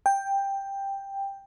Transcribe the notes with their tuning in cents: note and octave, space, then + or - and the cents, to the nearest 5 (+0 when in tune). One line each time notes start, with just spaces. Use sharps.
G5 +10